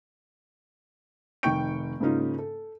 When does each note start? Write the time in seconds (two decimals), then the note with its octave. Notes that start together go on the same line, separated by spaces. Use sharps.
1.43 F1 D#3 G5 C#6 G6 D7
2.00 G#2 C#3 A#3 C#4 D#4 F4
2.39 A4